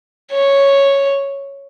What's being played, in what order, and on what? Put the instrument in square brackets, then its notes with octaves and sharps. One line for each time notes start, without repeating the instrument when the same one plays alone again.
[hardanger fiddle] C#5